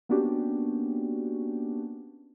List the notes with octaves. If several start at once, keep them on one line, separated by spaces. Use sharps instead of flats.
A#3 B3 C#4 D4 F#4 G4